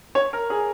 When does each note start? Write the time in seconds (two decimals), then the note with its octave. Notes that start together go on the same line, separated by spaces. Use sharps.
0.15 C#5
0.33 A#4
0.50 G#4